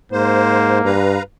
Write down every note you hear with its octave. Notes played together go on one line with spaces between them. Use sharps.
G#2 A#3 C5
G2 B4 F5 A#5